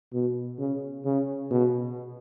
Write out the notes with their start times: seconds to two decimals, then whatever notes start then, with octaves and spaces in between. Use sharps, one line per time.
0.13 B2
0.59 C#3
1.05 C#3
1.51 B2